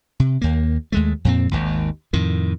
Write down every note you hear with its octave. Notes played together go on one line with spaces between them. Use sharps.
C3
D#2 A#3
D#2 G#3 A3
F2 A#2 C4
G#1 D#2
F2 A2 D#3